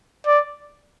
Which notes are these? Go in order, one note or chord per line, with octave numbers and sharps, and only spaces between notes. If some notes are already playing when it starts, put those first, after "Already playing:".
D5